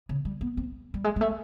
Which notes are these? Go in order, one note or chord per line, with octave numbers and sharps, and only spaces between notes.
C#3
G3
B3
C4
G3
G#3
G#3
A3